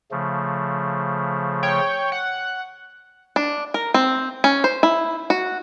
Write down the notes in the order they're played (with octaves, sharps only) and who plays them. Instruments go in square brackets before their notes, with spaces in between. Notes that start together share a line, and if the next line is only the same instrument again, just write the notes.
[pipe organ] C#3 F3 A3
[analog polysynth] C#5 G5
F#5
[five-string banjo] D4
A#4
C4
C#4
C5
E4
F#4